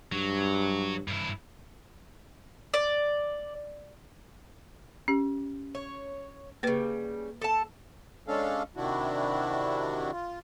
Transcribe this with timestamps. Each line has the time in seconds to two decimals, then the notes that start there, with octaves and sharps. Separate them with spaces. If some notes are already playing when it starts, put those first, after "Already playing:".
0.12 G2 F#3
1.08 G2 E4
2.74 D5
5.08 C#4 G4
5.75 C#5
6.63 C#3 G3 A#3 B4
7.41 A4 A5
8.28 G#3 C#4 D4 A4 F5
8.76 C3 D#3 D4 E4 F#4
10.12 F4